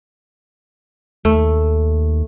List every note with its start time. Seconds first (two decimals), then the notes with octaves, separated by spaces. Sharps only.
1.25 D#2 A3